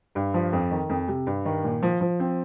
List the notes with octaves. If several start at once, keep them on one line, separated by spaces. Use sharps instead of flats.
G2
F3
F2
D#3
F2
C3
G2
D#3
A#2
F3
F3
C4